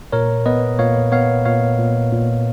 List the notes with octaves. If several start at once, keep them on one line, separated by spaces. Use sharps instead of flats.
A#2 A#4 C#5
B3 B4 D#5
A#2 C#5 F5
B3 C#5 F5
A#2 C#5 F5
A#2
A#2